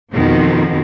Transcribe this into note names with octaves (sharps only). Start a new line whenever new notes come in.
F2 B2 D#3 F3